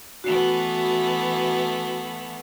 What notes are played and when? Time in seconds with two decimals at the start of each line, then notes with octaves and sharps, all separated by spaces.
0.24 E3 A3 B3 F#4